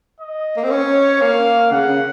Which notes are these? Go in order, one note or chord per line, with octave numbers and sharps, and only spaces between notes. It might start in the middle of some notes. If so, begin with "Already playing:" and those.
D#5
A#3
C4
C#4 C#5
A#3 F5
C#3 F#5
C#3